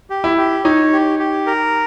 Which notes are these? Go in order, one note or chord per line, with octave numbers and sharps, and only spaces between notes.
G4
E4
G4
D#4 C#5
G4
G4
A#4